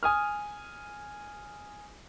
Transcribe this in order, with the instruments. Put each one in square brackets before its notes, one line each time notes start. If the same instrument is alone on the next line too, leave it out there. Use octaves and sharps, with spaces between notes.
[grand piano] G#5 D#6 F6